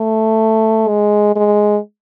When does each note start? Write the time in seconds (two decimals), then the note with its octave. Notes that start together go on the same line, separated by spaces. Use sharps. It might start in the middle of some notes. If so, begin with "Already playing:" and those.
Already playing: A3
0.88 G#3
1.36 G#3